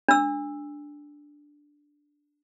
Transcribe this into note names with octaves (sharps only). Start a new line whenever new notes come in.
D4 E6